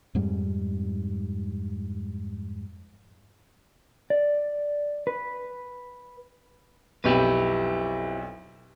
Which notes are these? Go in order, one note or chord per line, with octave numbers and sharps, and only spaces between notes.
F2 G#2 G3
D5
B4
B1 F2 E4 G4 B4